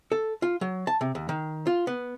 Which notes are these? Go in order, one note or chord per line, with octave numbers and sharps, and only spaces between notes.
A4
F4
F#3
A5
C3
D#2
D#3
F4
B3